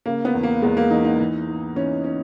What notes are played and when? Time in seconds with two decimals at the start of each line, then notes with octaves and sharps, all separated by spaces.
0.06 C#3 A#3
0.25 B3
0.34 E2
0.43 A#3
0.62 E2 G#3
0.77 A#3
0.91 E3 D#4
1.04 D#4
1.20 E3
1.47 G#2
1.76 E3 C#4
2.04 C#4